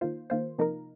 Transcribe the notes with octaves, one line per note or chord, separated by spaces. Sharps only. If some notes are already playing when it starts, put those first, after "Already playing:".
D#3 A#3 F4 C5
D#3 A#3 F4 C5
C3 F3 A#3 D#4 A#4